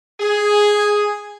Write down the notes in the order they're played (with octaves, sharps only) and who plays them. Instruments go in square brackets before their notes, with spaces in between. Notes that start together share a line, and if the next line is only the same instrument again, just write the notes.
[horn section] G#4